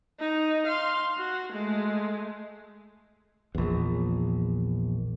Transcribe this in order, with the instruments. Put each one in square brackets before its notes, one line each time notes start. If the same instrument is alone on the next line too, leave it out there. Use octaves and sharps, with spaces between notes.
[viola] D#4
F5 C6
F#4
G#3 A3
[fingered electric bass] A#1 E2